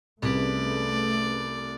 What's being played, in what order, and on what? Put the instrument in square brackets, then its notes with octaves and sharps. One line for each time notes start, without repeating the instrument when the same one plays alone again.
[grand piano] C2 [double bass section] A3 [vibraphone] C#4 G#4 B4 [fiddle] D5